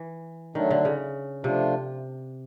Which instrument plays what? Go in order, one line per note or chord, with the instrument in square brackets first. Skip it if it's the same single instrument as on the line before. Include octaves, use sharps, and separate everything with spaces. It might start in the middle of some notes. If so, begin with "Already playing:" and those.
Already playing: [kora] E3
[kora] D#3 [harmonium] F#3 A3 D4
[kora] D3
C#3
[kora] C3 [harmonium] F3 A3 D4 F4